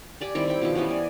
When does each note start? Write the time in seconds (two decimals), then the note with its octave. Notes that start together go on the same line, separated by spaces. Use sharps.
0.21 G4 D5 G#5
0.35 D#3 G3 C4 E4
0.48 E4 G5
0.61 B2 D#3 F3
0.75 E3 G3 B3 C#4
0.88 D5 G#5